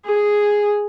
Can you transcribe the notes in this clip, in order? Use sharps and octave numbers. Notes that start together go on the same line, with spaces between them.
G#4